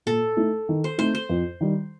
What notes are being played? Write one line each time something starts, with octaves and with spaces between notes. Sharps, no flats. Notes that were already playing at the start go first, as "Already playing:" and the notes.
A#2 A4
A3 D#4
D#3
C5
A3 C4 D#4 C5
C5
F2
D#3 G3